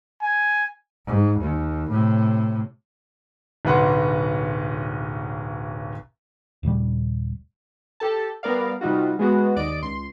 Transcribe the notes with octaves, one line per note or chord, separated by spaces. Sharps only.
G#5
G#2
D#2
A2 C3
D1 B1 B4 F#5 C6
D#1 A#2 C#3 G3
G4 A4 A5
G3 B3 A#4 D5 F5
C3 G3 D#4 F4 F#4
G#3 B3 F#4
D#2 D5 D#5 D7
C#2 C6